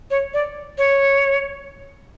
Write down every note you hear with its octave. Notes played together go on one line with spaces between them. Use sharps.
C#5
D5
C#5